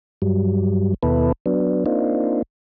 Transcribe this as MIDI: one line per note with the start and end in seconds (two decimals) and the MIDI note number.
0.22 0.94 43
0.22 0.94 54
0.22 0.94 55
1.03 1.32 39
1.03 1.32 47
1.03 1.32 59
1.03 1.32 64
1.03 1.32 69
1.03 1.32 71
1.46 1.84 54
1.46 1.84 59
1.46 1.84 62
1.86 2.42 58
1.86 2.42 60
1.86 2.42 62
1.86 2.42 63
1.86 2.42 65